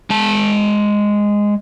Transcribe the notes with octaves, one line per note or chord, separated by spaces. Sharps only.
G#3 A5